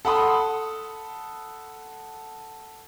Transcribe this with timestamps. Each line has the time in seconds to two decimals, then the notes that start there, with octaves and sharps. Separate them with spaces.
0.05 A4 F#5 B5 C6 D#6